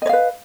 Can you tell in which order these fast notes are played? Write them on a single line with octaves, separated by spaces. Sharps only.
D#5 C#5 F5 B4